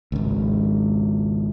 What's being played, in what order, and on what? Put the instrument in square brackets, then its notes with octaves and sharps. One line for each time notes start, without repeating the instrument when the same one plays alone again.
[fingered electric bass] G#1 C#2